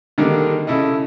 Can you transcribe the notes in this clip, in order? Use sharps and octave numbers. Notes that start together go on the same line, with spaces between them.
D3 D#3 G3 G#3 A#3 D4
C#3 E4 A4 D#5